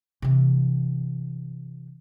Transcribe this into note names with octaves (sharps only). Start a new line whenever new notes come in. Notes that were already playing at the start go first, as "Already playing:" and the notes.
C3 E3